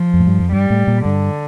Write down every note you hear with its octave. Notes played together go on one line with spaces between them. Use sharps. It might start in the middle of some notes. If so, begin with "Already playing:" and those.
Already playing: F3
F2
A2
G2
F2
G2 G3
A2
A#2
G2 D3